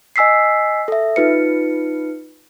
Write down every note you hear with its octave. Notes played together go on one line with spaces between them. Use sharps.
D#5 G#5 E6 B6 C7
A4 E5
D#4 F4 B4 C#7